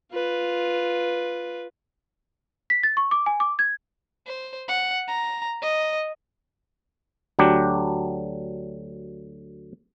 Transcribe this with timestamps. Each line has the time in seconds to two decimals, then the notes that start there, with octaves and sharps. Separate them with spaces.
0.12 F4 B4
2.70 B6
2.83 A6
2.97 C#6
3.11 D6
3.26 G#5
3.40 D6
3.59 G#6
4.26 C5
4.68 F#5
5.08 A#5
5.62 D#5
7.39 D2 F#3 D4 G4